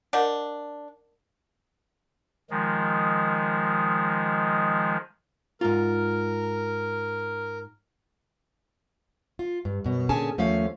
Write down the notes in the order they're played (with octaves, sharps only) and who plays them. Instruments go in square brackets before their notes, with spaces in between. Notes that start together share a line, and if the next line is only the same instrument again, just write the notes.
[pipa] D4 [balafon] A#4 D#5 F#5
[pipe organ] D#3 F3 G#3
[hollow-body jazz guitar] G#2 F4 [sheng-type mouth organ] A#4
[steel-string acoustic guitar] F4
G2
F#2 B2
A#2 D3 C#4 G#4 G#5 A5
D#2 F3 A3 C#4 F5